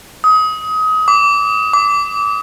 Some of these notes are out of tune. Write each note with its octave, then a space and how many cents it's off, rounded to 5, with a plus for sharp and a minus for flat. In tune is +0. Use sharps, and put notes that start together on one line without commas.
D#6 +25
D6 -25
D6 -20